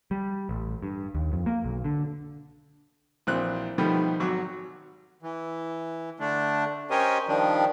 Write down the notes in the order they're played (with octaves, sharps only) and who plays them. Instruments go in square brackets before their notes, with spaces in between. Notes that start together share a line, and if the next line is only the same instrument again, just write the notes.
[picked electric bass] G3
A1
G2
D#2
F2
A#3
B1
D3
[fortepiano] A#1 E3 C4 F#6
B2 D#3 F3 G3 A3 B3
G#1 F#3 F#4 D6
[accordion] E3
D3 A3 D4
C#4 G4 A#4 C5 C#5 D#5
D#3 F3 G3 D4